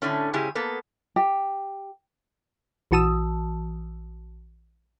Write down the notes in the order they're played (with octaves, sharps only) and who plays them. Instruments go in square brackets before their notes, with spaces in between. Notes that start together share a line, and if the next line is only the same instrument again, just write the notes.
[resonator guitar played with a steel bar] A2 D3 A3 C#4
G#2 C#3 C#4 E4 G4 G#4
A#3 B3 A4
[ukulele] G4
[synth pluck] A#1 E3 F#4 A5 D#6 E6